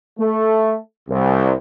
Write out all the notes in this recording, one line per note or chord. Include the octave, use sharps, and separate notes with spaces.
A3
C2